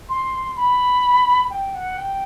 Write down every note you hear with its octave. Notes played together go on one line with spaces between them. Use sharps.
C6
B5
G5
F#5
G5